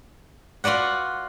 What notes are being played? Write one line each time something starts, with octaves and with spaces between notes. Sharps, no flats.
F4 F#4 B4 D5 F#5